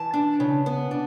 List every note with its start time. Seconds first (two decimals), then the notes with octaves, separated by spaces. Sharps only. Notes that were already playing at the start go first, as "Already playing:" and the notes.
Already playing: E3 A5
0.13 D4
0.40 C#3
0.66 B3
0.91 D4